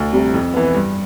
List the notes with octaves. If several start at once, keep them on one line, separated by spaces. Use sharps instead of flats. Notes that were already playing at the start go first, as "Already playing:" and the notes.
Already playing: D2
C3 G3
F2
E3 B3
G2